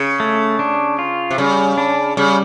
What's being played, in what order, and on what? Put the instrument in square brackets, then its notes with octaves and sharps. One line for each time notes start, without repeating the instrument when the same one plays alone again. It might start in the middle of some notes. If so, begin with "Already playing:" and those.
Already playing: [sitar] C#3
[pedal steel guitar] A3
D4
F4
[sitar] C3
[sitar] C#3 [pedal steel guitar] G3
[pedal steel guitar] D4
[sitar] C#3 [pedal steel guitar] G3